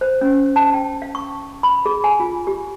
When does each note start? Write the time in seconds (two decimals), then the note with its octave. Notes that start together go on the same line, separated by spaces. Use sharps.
0.01 C5
0.21 C#4
0.56 A5
0.73 G5
1.02 F5
1.15 C#6
1.63 B5
1.86 G#4
2.04 G#5
2.20 F4
2.47 G4